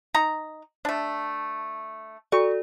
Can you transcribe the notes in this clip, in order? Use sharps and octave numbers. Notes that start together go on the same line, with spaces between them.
D#4 A#5
A3 D4
F#4 A4 D5 C#6